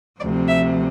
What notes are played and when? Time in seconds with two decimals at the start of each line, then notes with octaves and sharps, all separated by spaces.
0.20 D2 C3 F3 D5
0.48 E5